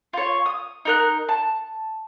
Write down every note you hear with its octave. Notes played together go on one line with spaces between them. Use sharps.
F4 C#5
D#6
D#4 A#4 F#6
A5